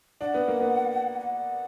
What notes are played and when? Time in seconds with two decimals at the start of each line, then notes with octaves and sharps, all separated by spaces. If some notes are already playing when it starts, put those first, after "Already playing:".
0.21 D4 F#5
0.34 B3
0.48 A#3
0.60 B3
1.20 F#5